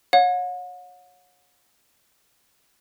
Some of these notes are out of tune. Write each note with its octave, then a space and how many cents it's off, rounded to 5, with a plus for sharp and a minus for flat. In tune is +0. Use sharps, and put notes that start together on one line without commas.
C#5 +5 F#5 -40